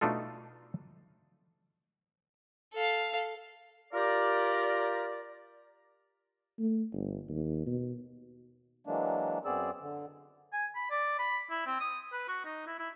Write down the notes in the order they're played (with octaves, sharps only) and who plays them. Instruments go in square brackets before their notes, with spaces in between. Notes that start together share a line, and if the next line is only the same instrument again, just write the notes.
[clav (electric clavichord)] B2 A3 D4 D#4 F4 A4
[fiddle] A4 F5
[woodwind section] F4 G4 A#4 D5
[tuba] A3
G1
D#2
B2
[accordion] E3 F#3 G#3 A#3 D4
F#2 B3 C4 G#4 D5 E6
D3
[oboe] G#5
B5
D5
B5
E4
C4
D#6
B4
F#4
D#4
E4
E4